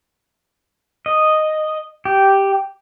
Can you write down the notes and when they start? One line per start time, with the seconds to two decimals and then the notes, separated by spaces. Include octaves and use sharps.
1.06 D#5
2.05 G4